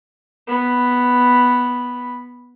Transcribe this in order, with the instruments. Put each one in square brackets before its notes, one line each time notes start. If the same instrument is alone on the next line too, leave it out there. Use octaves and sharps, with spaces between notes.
[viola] B3 B5